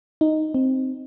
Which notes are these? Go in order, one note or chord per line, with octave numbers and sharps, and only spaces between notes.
D#4
C4